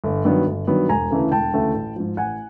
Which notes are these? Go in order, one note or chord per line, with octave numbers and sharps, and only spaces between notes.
G1
G2 D#3 F#3 B3
G1
G2 D#3 F#3 B3
E1 G#5 A#5
D2 C#3 E3 A3
E1 G5 A5
D2 C#3 E3 A3
A1
G#2 F3
A1 F#5 G#5